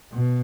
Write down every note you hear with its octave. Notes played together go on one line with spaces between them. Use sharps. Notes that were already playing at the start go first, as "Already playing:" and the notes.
B2